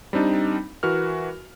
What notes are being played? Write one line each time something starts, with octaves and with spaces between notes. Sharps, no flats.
G3 C4 D4 D#4
E3 F#4 A#4 B4 F6